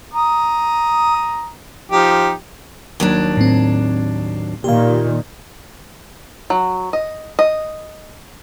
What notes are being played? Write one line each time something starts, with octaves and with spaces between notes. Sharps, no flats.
A#5 D#6
F3 D#4 G4
D#2 F#3 D4
A2 C4
A#2 D#3 G4 F5
F#3
D#5
D#5